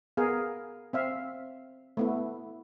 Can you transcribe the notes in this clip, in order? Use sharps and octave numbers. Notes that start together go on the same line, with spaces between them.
B3 G#4 A#4 F5
C4 E5 F5
A3 B3 E4